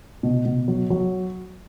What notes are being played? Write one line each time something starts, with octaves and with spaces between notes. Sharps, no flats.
B2
B2
F#3
F#3